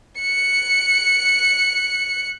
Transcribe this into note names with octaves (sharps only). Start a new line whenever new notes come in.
F#6 C#7